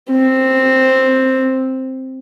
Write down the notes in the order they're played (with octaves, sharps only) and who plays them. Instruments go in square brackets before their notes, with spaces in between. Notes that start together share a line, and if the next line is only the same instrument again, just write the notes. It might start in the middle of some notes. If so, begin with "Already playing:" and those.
[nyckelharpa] C4